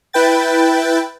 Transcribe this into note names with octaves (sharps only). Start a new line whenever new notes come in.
E4 B4 G5 A6